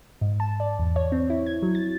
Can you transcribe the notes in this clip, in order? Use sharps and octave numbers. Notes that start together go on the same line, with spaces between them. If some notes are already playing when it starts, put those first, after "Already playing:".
G#2
A5
D5
E2
C#5
C4
E4
G#6
F#3
A6